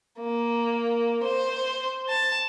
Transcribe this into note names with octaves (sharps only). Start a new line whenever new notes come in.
A#3
C5
A5